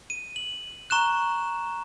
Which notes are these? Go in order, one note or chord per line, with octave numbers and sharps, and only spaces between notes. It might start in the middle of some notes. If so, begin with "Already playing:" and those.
D#7
F#7
A#5 C#6 F#6 E7